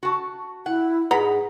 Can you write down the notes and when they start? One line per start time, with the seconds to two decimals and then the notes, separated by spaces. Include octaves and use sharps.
0.03 F#4 A5
0.66 E4 F#5
1.11 G#2 G#4 B4 F#5 A#5 B5